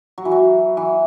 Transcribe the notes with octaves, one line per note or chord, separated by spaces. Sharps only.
F#3
E3
F#3
E3